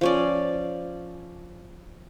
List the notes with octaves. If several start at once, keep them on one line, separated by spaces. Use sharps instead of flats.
F3 C#4 D5